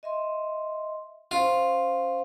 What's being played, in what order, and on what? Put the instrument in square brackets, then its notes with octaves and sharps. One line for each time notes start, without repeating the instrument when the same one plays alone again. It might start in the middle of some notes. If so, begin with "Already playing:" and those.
[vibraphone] D#5 E5 C6
[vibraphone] C#4 C5 F5 [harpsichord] F4